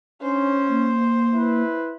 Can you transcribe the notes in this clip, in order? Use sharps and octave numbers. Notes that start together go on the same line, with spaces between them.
C#4 D4 C5
A#3
E4 B4